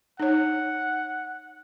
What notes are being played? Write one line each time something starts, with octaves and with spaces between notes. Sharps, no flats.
D#4 C#5 F#5